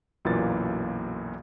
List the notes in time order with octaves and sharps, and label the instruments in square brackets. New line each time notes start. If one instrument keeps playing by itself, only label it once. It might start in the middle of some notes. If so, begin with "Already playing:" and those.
[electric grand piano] B1 F#2 A#2 E3 A#3 A6